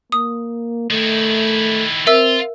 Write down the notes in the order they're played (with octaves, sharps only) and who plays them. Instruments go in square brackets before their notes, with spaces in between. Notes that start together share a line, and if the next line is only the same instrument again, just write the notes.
[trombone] A#3 [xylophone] D#6
[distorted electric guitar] D#3 E4 [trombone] A3
[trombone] C4 [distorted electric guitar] F4 [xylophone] A#4 E5 E6